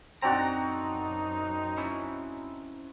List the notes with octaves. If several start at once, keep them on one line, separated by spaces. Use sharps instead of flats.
F#2 C4 D4 D#4 F#4 A#5
C#4 E4